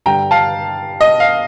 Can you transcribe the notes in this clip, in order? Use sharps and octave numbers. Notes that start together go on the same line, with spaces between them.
G2 D3 G3 G5 A#5
F5 A5
D#5
F5